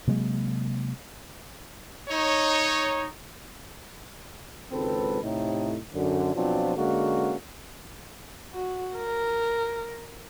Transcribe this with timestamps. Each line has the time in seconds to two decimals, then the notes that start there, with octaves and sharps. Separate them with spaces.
0.07 C3 F#3 G#3 A#3
2.09 D#4 C#5
4.71 G#1 C#2 C4 A4 B4
5.22 A2 C3 D#4
5.93 F#2 D3
6.35 B2 F3 F#3 C4 D4 F4
6.76 D3 G#3 A#3 C#4 F#4
8.54 F#4
8.96 A#4